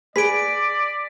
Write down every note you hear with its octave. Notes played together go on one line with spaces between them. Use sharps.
G#4 B4 D5 B6 D7